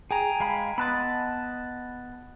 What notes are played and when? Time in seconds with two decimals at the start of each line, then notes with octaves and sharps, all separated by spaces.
0.11 G#4 G5 G#5 A#5
0.40 G#3 F5 B5
0.78 B3 D#5 A5 B5 F#6 A6